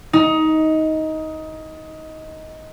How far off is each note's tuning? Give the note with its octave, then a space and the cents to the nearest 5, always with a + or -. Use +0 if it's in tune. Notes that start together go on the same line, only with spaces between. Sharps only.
D#4 +15